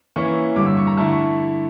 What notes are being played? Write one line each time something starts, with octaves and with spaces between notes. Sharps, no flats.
E3 A#3 C#4 E4 C#6
G2 D3 G3 D6
E6
C#6
A#5
D3 A3 E4 A5
C#6